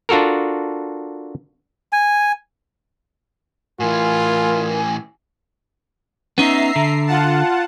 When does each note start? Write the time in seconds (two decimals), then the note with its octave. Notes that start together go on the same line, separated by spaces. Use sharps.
0.09 D4 F4 F#4 A4 A#4
1.93 G#5
3.80 A2 E3 F4 A#4 G#5
6.38 B3 C#4 D#4 E5 A#5 C7
6.76 D3
7.06 F4 F#5 A5